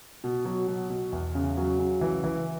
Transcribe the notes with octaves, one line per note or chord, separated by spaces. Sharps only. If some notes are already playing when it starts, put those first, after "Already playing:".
B2
F#3
B2
B2
E2
C#3
F#3
C#3
E3
E3